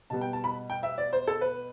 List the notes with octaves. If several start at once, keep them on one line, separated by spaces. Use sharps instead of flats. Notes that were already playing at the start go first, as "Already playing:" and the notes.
B2 G3 B3 A5
G5
A5
B5
G5
E5
D5
C5
A4
B4